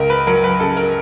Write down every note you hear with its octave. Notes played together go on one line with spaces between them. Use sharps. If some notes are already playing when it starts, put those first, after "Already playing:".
Already playing: C#2 A#4
B4
F#3 A#4
B4
C#3 A4
A#4